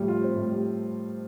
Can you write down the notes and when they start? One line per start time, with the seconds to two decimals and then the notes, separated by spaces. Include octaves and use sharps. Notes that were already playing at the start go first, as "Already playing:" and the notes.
Already playing: A2 F3 G3
0.08 F4
0.21 C4
0.36 A2
0.50 G3